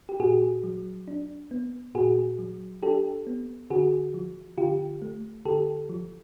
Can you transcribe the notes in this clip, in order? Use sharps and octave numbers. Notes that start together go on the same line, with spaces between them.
G4
A#2 F#4 G#4
F#3
D4
B3
A#2 F#4 G#4
F#3
D4 G4 A4
B3
D3 F#4 G#4
F3
D3 F4 G4
A3
D3 G4 A4
F3